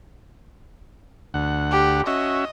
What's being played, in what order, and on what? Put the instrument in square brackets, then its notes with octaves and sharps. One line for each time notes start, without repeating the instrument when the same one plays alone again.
[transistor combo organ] D2 F#5
[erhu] G4
[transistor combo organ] C#4 F#4 E5 [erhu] D#5